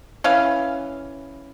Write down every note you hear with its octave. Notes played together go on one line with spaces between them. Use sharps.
E3 C#4 F5